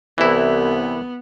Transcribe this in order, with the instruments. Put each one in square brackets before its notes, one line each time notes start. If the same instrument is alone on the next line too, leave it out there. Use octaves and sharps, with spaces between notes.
[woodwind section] C2 [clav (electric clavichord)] E3 E4 [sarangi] B3